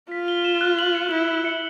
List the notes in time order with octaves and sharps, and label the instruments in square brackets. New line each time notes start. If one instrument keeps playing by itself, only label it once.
[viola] F4 [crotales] B6
[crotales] G7
E7
F#6
F#7
C#7
[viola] E4 [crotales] F#7
[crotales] F#7
C#7